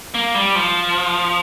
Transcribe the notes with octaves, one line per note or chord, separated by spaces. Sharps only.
A#3
G3
F3